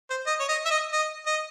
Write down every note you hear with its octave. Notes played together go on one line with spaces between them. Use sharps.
C5
D#5
C#5
D#5
E5
D#5
D#5
D#5